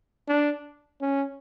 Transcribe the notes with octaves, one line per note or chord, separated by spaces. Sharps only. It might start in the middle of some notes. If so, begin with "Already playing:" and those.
D4
C#4